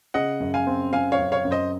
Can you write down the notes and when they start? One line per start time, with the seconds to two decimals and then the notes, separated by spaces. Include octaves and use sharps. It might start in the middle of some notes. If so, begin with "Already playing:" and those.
0.14 C#3 D#5 F#5
0.40 F#2
0.54 F5 G#5
0.67 C4
0.92 C4 F5 G#5
1.12 C#5 F5
1.19 F#2
1.32 C#5 F5
1.45 F#2
1.51 C5 D#5